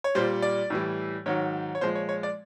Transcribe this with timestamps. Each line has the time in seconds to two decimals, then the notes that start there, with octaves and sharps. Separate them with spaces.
0.04 C#5
0.15 A#2 G3 C5
0.42 D5
0.70 A2 E3 G3
1.26 G#2 D#3 F#3 C#5
1.75 C#5
1.81 A#2 F3 G#3 C5
1.95 C#5
2.09 C#5
2.23 D5